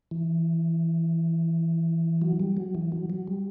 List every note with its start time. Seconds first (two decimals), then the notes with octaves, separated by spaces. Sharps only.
0.11 E3
2.22 F#3
2.40 G3
2.57 F#3
2.75 E3
2.92 F#3
3.10 F#3
3.27 G3